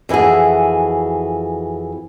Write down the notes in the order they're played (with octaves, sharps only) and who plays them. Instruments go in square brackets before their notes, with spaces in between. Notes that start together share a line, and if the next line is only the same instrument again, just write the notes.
[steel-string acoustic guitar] F2 E3 E4 F#4 G#4